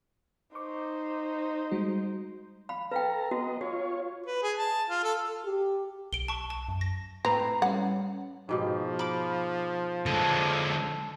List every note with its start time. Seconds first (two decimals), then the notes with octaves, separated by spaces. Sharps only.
0.55 D#4 C5 C#6 D6
1.71 G3 G#3 F#4
2.69 F5 B5
2.91 A4 B4 F5 G5 A#5
3.31 B3 F#4 D#5
3.61 F4 F#4 C#5
4.26 B4
4.42 G#4
4.58 A5
4.90 F4
5.04 A4
5.45 G4
6.13 B1 D7 G7
6.28 A5 C#6
6.50 A5
6.69 F#2
6.81 A#6
7.25 A2 C4 B4 A#5
7.62 G3 C#4 F#5
8.49 G#2 B2 F3 G4
8.99 B5 D6
10.06 D3 G#3 A4 A5